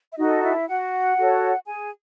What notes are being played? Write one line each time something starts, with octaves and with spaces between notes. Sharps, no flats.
E5
D#4 F#4 A4 D#5
E4 E5
F#4 F#5
F#4 A4 C#5
G#4 G#5